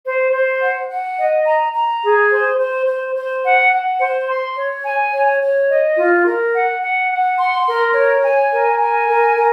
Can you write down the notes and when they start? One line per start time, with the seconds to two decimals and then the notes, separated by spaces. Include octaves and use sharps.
0.05 C5
0.33 C5
0.62 F#5
0.89 F#5
1.18 D#5
1.46 A#5
1.74 A#5
2.03 G#4
2.31 C5
2.59 C5
2.88 C5
3.15 C5
3.44 F#5
3.72 F#5
4.00 C5
4.28 C6
4.56 C#5
4.85 G#5
5.13 C#5
5.41 C#5
5.69 D#5
5.97 F4
6.25 A#4
6.53 F#5
6.82 F#5
7.10 F#5
7.39 C6
7.67 A#4
7.95 C#5
8.23 G#5
8.51 A#4
8.79 G#5
9.08 A#4
9.35 A#4